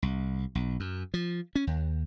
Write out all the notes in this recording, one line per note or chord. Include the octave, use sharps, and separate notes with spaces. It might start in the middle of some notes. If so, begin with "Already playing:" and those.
C2
B1
F#2
F3
C#4
D#2